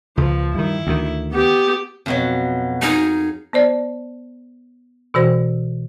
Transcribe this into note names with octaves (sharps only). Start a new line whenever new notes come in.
C#2 F3
G2 D#3 E4
D2 D#3
B3 G4
F2 B2 F#3
D#4 G#4 A#4 G#5
B3 C5 D5
B2 E3 F#4 C5